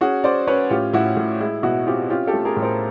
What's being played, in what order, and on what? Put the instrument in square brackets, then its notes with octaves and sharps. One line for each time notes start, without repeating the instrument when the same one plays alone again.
[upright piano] C#4 F#4 G#4
C#4 C5 D5
C#4 B4 C#5
A2 F4 G4
A2 E4 F#4
A2
G#3 E4
B2 E4 F#4
C4 F4 G4
C#4 F4 G4
G4 A4
A3
G#4 A#4
A2
A#4 C5